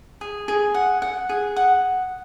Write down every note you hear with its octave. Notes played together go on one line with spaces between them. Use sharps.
G#4
G#4
F#5
F#5
G#4
F#5